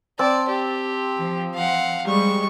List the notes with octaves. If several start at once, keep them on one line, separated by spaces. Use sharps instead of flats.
C4 D5 A5
G4
F3
F5 F#5
G3 G#3 C#6